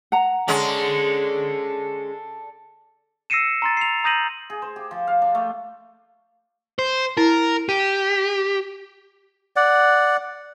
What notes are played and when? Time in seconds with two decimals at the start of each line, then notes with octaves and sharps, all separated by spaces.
0.12 F#5 A#5
0.48 G#3 C#4 A4 D5
3.30 E6 A#6 C7 C#7 D#7 E7
3.62 A#5 C6 A6
3.77 C7 F7
4.04 A#5 D#6 G6 A#6 D#7 F#7
4.50 G#4
4.62 C5
4.76 G4
4.91 F3
5.07 F5
5.22 D4
5.35 A3
6.79 C5
7.17 E4 A#4
7.69 G4 D#7
9.56 D5 F#5